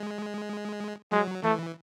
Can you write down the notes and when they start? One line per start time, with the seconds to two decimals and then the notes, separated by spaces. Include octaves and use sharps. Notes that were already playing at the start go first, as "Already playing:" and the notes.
Already playing: G#3
1.12 F#3 G#3
1.43 E3 A3